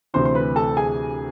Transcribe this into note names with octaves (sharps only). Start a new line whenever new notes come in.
D2 C3 E3 C5 C6
C6
B4 B5
A4 A5
G#4 G#5